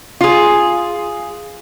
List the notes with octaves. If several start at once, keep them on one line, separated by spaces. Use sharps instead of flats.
F4 G#4